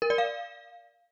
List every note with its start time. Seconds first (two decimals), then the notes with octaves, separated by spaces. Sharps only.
0.02 A#4
0.10 D5
0.18 F5